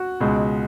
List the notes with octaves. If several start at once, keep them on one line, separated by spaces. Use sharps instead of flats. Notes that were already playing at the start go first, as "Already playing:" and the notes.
Already playing: F#4
C#2 B2 G#3